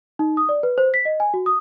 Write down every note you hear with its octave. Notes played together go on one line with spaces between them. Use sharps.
D#4
D#6
D5
B4
C5
B6
D#5
G#5
F#4
D#6